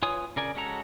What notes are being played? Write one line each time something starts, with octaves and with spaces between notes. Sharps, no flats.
F4 B4 C#5 G#5 D#6
C#3 A#4 D5 G#5
G#3 C#4 F#4 A4 A#5